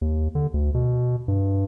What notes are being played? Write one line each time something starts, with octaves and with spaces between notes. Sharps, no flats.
D#2
D3
D2
B2
G2